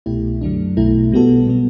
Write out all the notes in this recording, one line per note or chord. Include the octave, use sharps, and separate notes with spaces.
C2 B2 A3 E4 G4
F#2 D3 F#3 A3 D4
B1 B2 A3 E4
B2 G3 B3 F#4 A4
B2 F#3 B3